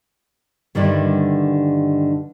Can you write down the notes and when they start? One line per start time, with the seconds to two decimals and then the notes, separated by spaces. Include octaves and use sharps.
0.75 G2 D3 D#3 G3 D4 E4